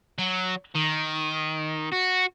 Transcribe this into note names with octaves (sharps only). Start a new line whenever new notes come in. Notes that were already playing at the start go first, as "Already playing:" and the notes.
F#3
D#3
F#4